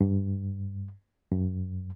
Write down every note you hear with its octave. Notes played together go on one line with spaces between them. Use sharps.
G2
F#2